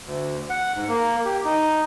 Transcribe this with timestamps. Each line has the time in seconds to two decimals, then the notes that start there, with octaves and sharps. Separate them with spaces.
0.06 D2
0.50 F#5
0.75 G#2
0.88 A#3
1.25 G4
1.45 D#4